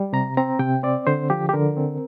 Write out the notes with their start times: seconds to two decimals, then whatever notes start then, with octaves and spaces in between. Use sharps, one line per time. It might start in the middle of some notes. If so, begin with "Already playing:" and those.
Already playing: G3
0.13 C3 A#5
0.37 C4 A#5
0.59 C3 G5
0.83 C4 D5
1.07 D3 C5
1.30 F3 G4
1.49 G4
1.53 D3 A#4
1.77 C4